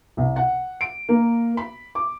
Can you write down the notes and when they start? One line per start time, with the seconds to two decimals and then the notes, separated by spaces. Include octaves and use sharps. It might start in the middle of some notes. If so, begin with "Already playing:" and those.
0.17 C2
0.36 F#5
0.81 D7
1.09 A#3
1.57 B5
1.95 D6